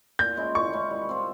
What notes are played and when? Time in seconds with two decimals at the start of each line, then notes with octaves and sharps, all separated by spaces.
0.19 A#2 G6
0.37 G#3 C#4 E4
0.55 A#2 C#6
0.73 G#3 C#4 E4
0.91 G3
1.09 C4 F4 C5